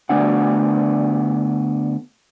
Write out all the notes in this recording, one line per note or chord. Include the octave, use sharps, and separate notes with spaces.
D3 A3 B3 D4 F#5